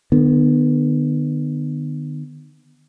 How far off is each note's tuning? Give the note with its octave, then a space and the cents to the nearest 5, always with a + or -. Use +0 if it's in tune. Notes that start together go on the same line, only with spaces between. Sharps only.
D3 +45 B3 +0